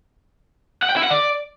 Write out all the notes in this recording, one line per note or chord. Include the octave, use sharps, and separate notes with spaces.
F#5
G5
E4
F#5
D5